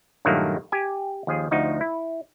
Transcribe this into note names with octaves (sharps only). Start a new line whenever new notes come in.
G2 A#2 D#3 F#3 A3 A#3
G4 G#5
D#2 F3 G#4
D2 F3 D#4 F#4
E4